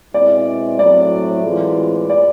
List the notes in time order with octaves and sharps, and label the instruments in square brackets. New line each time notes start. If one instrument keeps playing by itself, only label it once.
[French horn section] B2 G#3 C4 E4 [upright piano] D5
[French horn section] A2 F#3 A3 C4 E4 [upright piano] D5
[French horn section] A2 E3 G#3 C4 F4
[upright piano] D5